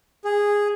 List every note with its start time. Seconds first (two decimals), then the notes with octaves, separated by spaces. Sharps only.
0.25 G#4